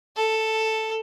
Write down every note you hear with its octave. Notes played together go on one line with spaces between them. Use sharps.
A4